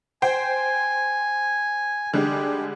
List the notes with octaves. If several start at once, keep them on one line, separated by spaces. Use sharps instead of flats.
C5 G5 G#5
D3 G3 G#3 G4